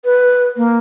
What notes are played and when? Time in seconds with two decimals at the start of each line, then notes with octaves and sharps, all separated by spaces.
0.05 B4
0.57 A#3